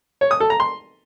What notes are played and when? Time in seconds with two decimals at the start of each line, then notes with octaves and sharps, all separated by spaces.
0.21 C#5
0.31 D#6
0.40 A4
0.50 A#5
0.60 C6